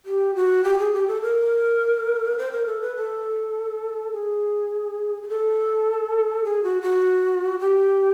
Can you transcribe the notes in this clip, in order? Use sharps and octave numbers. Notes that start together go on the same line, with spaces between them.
G4
F#4
G4
G#4
G4
A4
A#4
C5
A#4
A4
B4
A4
G#4
G#4
A4
G#4
F#4
F#4
G4